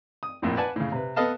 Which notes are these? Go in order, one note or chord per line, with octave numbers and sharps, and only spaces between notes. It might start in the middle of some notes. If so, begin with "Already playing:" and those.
D#6
A#1 F2 A2
B4 D5 F#5 G#5 A5
A2 C#3
C3 B4
B3 A4 B4 D#5 F5 A5